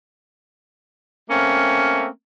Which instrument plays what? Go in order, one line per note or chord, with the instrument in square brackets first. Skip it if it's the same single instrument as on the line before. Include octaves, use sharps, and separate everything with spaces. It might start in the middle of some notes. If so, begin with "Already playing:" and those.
[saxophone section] A3 A#3 C4 C#4